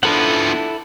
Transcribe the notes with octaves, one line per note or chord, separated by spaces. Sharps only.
F3 B3 D4 E4 A4 F#5